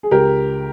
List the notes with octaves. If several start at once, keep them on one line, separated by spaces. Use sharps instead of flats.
G#4
C#2 G4 A#4